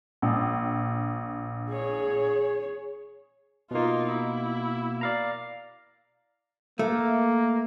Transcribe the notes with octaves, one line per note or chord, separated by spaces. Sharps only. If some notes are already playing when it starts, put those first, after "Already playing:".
A#1
G#4 C#5
B2 A#3 D#4 F4
E4
D5 F5 A#5
A3 A#3